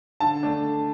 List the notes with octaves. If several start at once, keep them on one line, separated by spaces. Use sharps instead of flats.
D3 A5
A3 D4